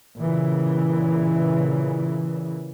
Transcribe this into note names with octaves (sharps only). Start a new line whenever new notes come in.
A#2 C#3 E3